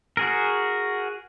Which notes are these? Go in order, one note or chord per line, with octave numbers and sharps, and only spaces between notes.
F#4 G#4 A#4